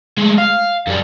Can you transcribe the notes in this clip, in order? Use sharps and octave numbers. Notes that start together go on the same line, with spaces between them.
G#3 A3
F5
F#2 G3